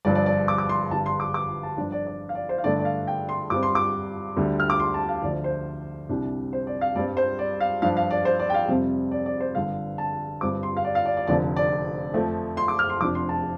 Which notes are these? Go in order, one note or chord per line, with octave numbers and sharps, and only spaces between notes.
G1 G2 F3 D5
D5
D5
D6
D6
C6
G1 G2 G3 A5
C6
D6
D6
A5
G2 F3 D4 D5
D5
D5
F5
D5
C5
F5
G2 D3 A3 D4 D5
D5
F5
G5
C6
G2 G3 C4 D6
C6
D6
D2 D3 G3
F6
D6
C6
A5
F5
D2 D3 F3 D5
C5
C2 C3 G3 D4
C5
D5
F5
G2 G3 C4 D5
C5
D5
F5
G2 F3 D4 F5
F5
D5
C5
D5
G5
F5
F2 C3 G3 C4
D5
D5
C5
G1 G2 D3 F5
A5
G1 G2 G3 C4 D6
C6
F5
D5
F5
D5
D5
F1 F2 D3 F3 D5
D5
F2 F3 A3 C4
C6
D6
F6
C6
F1 F2 F3 D4 D6
C6
A5